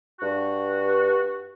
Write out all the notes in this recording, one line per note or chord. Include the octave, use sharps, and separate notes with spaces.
G2 F#4